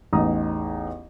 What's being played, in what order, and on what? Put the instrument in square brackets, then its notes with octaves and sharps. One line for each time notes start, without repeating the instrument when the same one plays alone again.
[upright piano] A1 E2 D#4 A#5 D#6